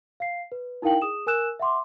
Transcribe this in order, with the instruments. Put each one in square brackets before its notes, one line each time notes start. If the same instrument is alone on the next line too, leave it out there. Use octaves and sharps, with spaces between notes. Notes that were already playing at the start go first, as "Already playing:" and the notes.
[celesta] F5 C7
B4
D#4 E4 A#4 F5 G5 F#7
G#4 D#6 E7
A#4 G#5 E6 F#6 E7
E5 F#5 C6 D6